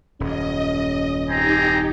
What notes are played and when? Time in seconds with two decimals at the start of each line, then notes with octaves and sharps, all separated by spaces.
0.20 D#1 F#2 C#4 D#5
1.29 C4 D#4 G4 G#5 A#5